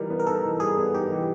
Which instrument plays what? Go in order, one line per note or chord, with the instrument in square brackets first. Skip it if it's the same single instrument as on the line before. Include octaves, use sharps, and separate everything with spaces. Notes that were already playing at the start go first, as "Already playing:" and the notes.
Already playing: [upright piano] E3 G3 D#4 [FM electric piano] A#4
[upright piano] B3
[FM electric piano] A#4
[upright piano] D#4 [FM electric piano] A4
[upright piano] E3
[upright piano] G3 [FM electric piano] G#4
[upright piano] B3
[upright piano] D#4 [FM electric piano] G4
[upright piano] E3